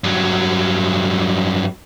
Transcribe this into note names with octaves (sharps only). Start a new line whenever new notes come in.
G2 F#3